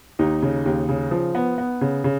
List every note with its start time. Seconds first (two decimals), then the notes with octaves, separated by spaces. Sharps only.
0.19 D#2 D#4
0.42 C#3
0.66 D#2
0.89 C#3
1.11 F3
1.35 B3
1.58 B3
1.81 C#3
2.04 C#3